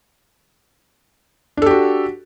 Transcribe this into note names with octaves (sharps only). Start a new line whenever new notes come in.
D4 F#4 G4 A4